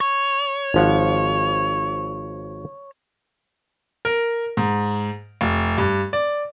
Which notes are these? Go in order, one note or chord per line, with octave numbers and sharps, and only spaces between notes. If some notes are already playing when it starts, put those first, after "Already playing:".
C#5
G#1 F3 F#5
A#4
G#2
F1
G2
D5